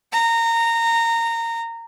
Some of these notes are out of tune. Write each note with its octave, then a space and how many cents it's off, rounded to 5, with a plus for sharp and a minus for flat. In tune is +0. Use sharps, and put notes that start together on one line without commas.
A#5 -20